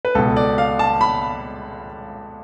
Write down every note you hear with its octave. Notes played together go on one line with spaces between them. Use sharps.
B4
C#2 B2 A4
D5
F5
A5
B5